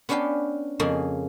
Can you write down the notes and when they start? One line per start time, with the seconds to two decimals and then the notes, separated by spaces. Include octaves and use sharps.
0.09 B3 C#4 D4 B4 F5 G5
0.79 F2 C#3 A#3 G#4